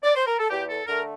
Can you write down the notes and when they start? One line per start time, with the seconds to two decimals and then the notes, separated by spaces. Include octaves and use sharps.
0.03 D5
0.16 C5
0.26 A#4
0.39 A4
0.50 E2 G4
0.69 A4
0.87 D3 A3 A#4